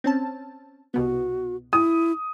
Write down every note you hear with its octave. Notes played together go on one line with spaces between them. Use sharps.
C4 C#4 A5
C2 B2 B3 F#4
E4 D#6